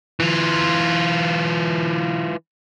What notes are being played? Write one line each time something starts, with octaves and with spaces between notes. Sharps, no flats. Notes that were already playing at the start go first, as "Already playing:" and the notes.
E3 F4